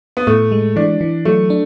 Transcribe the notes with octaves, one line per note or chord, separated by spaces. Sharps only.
B3
A2 A3
G#3
E3 D4
E3
F#3 A3
D4